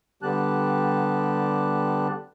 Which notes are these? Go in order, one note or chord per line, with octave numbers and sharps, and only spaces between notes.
D3 G3 B3 G4 A5 F#6